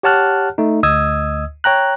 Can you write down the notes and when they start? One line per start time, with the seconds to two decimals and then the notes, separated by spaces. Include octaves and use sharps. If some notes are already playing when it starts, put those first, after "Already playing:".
0.03 G4 C#5 F#5 A5 F6 F#6
0.58 A3 D#4
0.83 D2 D#5 D#6 E6 G#6
1.64 C#5 G5 A#5 F#6